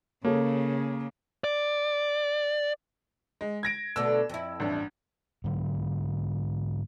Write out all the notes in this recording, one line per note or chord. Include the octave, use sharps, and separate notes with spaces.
C#3 A#3 G#4 A4 C#5
D5
G#3
G#6 A#6 D7
B2 D3 A3 E6
F2 E4
A1 G2 D4
G#2 D3 F#3